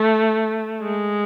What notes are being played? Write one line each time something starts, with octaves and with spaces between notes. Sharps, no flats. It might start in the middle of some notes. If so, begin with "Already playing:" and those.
Already playing: A3
G#3